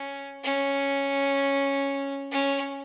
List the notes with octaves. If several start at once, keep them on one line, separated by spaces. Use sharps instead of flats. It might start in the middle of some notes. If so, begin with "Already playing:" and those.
Already playing: C#4
C#4
C#4